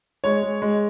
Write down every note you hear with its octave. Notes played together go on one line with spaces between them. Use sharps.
G#3 C#5
G#3
G#3